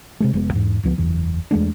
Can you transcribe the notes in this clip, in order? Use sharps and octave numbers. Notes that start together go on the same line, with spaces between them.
C3 G#3 A3
F1 G#3 B3
E2 G#2
D1 C#2 F3 B3
F#1 E2 E3
E2 G#3 A3 D4